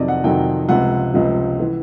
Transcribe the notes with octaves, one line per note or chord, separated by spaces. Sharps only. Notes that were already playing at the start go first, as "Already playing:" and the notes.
Already playing: F2 C3 D#3 F#3 D5 D#5
F#5
F2 C3 D#3 F#3 G5
C#2 C3 F3 F#5
C#2 C3 F3
E3